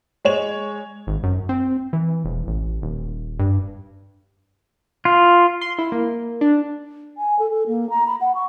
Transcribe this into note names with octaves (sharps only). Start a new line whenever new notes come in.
G#3 C#5 F7
G#1
F#2
C4
E3
E1
A1
D#1
G2
F4
C6
E4
A#3
D4
G#5
A4
A4
A#3
A#5
B5
F#5
C#6